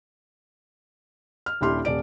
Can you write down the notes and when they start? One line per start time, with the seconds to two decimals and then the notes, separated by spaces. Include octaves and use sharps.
1.46 F6
1.61 D#1 D4 E4 G4 C6 F6
1.85 D#1 D5 D7